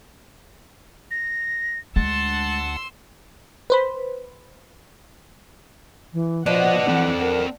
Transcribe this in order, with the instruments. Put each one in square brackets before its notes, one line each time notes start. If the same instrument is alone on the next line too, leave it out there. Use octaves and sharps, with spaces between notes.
[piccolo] A#6
[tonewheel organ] D2 F#5 A5 [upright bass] G#3 D4 [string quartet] C6 E6 [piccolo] A6
[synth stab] B4 C5 B5
[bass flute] E3
[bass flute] F3 [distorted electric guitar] B3 D#5 [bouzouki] D4 [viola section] F#5
[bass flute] E3 [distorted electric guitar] C4 A4
[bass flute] A#4